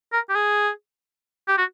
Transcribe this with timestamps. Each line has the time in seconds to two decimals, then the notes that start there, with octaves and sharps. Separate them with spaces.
0.13 A#4
0.29 G4
0.35 G#4
1.48 G4
1.58 F#4